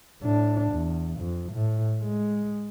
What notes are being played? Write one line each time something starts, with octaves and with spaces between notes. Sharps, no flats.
A2 D4
E2
F2
A2
G#3